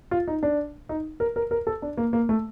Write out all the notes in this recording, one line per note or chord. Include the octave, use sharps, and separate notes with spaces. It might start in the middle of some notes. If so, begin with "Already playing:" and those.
F4
D#4
D4
D#4
A#4
A#4
A#4
A4
D4
A#3
A#3
A3